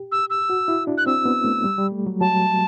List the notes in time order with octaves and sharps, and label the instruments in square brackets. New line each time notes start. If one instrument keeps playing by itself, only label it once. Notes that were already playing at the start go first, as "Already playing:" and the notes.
Already playing: [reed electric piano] G4
[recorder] E6
E6
[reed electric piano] F#4
E4
D4
[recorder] F#6
[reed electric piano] C4 [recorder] E6
[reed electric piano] B3
A3
G3
G3
A3
F#3
[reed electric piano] F#3 [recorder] A5